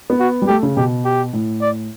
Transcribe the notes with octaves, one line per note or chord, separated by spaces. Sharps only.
B3
F#4
G3
A3 G4
C#3
B2 G4
G4
A2
D5